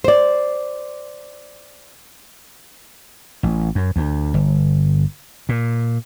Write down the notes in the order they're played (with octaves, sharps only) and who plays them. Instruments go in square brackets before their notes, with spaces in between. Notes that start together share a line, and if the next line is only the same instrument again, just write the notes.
[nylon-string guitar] C5 D5
[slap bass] A1
F#2
D2
G1
A#2